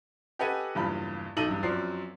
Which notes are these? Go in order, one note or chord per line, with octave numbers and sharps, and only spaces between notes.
G4 A4 B4 D#5 F#5 G#5
F#1 E2 G2 F4 B5
B1 D#4 A4 E6 D#7 F#7
E2 G2
F#2 F3 C4 D5 C7